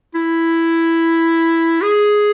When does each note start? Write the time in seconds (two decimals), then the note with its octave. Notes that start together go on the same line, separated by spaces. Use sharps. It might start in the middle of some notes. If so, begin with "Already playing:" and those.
0.15 E4
1.82 G#4